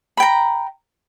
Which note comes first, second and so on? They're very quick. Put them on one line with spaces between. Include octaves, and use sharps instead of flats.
B5 G5 A#5